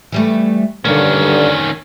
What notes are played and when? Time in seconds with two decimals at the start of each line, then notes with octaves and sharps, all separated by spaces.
0.12 E3 G3 A3
0.85 G2 D3 D#3 A#3 C#4